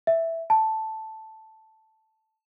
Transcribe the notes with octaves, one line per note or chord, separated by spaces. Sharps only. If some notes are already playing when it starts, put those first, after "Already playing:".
E5
A5